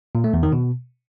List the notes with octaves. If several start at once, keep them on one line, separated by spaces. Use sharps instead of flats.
A#2
A3
E2
D#3
B2